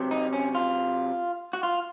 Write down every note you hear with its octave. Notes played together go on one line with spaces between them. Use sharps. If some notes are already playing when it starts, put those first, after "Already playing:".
Already playing: C3 F#3 C4
D#4
C#4
F4
F#4
F4